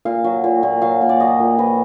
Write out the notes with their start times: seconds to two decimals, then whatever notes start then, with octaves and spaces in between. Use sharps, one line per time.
0.05 A#2 F5
0.24 F#3
0.44 A#2
0.63 A#2
0.82 F#3 F5
1.01 A#2
1.09 D5
1.20 F#3 D#5
1.40 A#2
1.58 F3 B4